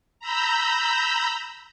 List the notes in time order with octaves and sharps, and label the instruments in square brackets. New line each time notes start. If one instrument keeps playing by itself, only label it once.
[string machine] A#5 B5 E6 G6